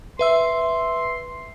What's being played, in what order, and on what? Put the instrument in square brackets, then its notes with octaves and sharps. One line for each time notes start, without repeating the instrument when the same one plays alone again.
[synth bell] B4 E5 E6 [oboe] C6